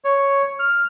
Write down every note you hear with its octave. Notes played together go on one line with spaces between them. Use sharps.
C#5
F6